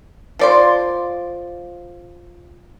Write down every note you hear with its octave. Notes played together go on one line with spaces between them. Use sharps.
F3 D5 C6